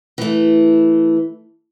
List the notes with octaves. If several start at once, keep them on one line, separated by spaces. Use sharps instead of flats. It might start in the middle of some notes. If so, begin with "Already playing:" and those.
E3 A3